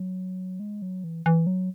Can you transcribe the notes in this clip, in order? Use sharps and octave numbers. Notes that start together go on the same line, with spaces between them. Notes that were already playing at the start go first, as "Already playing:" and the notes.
Already playing: F#3
G#3
F#3
E3
E3
F#3